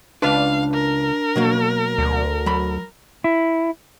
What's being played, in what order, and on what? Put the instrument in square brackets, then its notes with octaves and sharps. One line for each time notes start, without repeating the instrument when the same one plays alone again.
[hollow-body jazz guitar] C#2 B4 [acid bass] D4 [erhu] F5
[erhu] A#4
[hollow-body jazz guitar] B2 F#3 A#3
[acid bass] D2
[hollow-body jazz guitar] F#3 B5
[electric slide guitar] E4